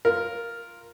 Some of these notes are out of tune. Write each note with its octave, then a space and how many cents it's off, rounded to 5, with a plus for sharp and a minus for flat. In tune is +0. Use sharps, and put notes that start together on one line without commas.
F4 +0 A#4 +0